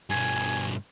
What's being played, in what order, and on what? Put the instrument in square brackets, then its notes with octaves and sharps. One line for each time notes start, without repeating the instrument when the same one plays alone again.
[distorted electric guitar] G2 B2 [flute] G#5